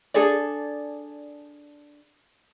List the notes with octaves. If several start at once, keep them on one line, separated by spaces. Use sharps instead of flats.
D4 G#4 A4 D5